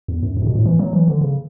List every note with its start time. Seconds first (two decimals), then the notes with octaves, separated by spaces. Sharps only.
0.08 E2
0.23 F#2
0.37 F#2
0.42 A2
0.46 B2
0.55 A2
0.65 E3
0.79 F#3
0.93 E3
1.08 D3
1.21 C#3